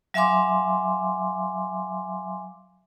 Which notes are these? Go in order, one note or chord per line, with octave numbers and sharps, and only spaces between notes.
F#3 E5 F5 G#5 C6 D6